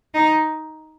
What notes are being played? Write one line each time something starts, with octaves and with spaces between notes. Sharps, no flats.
D#4